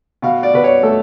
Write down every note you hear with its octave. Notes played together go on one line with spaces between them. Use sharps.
B2 F5
D5
B2 B4
C#5
A3 A4